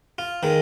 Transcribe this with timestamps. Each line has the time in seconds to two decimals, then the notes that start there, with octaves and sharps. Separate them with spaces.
0.18 F4
0.43 D#3 G#3